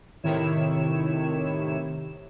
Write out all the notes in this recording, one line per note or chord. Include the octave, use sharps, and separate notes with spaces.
A2 C3 D#3 E4 C#5 E7